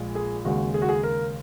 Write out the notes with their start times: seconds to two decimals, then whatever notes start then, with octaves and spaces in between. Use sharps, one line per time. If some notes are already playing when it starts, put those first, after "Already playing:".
Already playing: A#1 A#2 G#3
0.15 G#4
0.45 D#2 C#3 G#3 F#4
0.74 G#4
0.82 F#4
0.89 G#4
1.03 A#4